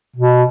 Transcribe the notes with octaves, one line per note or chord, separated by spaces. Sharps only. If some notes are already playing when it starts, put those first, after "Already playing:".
B2